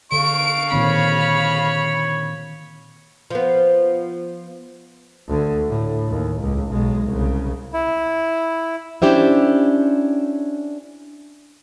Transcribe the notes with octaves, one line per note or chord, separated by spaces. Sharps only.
D3 F5 C#6 D7
A#2 D#3 C4 C#5 B5
F3 B3
D2 D3
A2
D#2
C#2
B1 G#3
C2 C#3
E4
C#4 D4 E4 G4 C5 E5